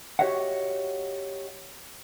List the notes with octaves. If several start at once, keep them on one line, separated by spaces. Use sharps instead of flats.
F#4 G4 C#5 D#5 E5 F#5